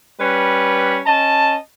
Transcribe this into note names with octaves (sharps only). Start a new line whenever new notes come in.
G3 C#4 B4
C#4 D#5 A5